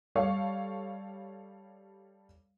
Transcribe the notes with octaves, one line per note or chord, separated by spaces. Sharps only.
G3 A4 C#5 F5 C#6